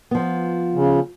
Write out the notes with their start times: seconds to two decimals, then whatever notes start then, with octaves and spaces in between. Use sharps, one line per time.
0.11 F3 B3
0.75 C#3